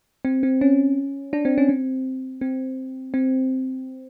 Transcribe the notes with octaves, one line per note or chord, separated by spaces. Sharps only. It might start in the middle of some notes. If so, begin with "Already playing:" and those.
C4
C4
C#4
D4
C4
C#4
C4
C4
C4